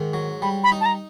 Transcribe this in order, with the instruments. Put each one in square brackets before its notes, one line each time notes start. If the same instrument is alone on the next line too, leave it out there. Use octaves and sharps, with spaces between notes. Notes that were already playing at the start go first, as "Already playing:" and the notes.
Already playing: [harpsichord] G#2 D#3
F#3
[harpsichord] G3 [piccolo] B5
[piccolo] B5
[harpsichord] D#4
[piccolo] A5
A#5